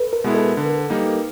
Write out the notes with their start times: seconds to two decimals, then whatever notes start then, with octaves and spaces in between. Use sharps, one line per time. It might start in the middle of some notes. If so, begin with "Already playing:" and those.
Already playing: A4 B4
0.13 A#4
0.24 B2 G#3 B3 E4
0.35 A4
0.57 D3
0.90 G3 A#3 D#4